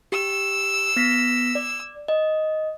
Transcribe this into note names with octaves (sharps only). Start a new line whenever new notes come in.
G4 E6
B3 A#6 B6
D5
D#5